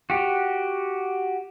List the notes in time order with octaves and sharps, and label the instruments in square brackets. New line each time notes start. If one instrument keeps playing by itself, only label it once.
[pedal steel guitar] F#4 G4